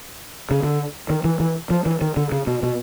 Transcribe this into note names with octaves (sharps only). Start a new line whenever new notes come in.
C#3
D3
D#3
E3
E3
F3
E3
D#3
D3
C#3
B2
B2